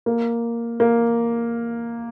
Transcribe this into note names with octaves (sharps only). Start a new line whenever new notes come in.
A#3
A#3